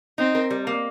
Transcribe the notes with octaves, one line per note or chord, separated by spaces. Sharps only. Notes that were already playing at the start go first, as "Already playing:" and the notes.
C4 D#4
A#4
G3
A#3